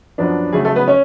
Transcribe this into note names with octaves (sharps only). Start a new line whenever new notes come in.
F#2 F3 B3 D4
C#3 F#3 A3 G#4
A3 A4
B3 B4
C#4 C#5